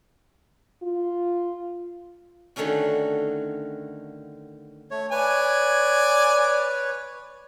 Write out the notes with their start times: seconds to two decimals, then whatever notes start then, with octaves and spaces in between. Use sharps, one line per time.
0.83 F4
2.56 D3 D#3 A3 C#4 F#4
4.91 A3 C#5
5.12 B4 C#5 D5 G#5